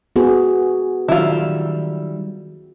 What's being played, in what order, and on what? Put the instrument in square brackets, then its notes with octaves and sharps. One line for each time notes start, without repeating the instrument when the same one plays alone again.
[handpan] B3 F#4 G#4
[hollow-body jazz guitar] D#3 F#3 G3 [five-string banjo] E4 F4